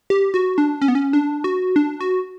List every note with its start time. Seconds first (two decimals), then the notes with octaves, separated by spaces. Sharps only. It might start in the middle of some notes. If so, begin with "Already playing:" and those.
0.10 G4
0.34 F#4
0.58 D4
0.82 C#4
0.88 B3
0.95 C#4
1.13 D4
1.44 F#4
1.76 D4
2.01 F#4